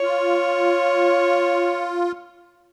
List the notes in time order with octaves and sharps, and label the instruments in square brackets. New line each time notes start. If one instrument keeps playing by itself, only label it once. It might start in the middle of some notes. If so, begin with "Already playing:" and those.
[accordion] F4 [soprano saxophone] C#5